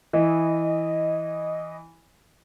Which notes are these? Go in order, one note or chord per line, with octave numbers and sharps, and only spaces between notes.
E3 E4 D#5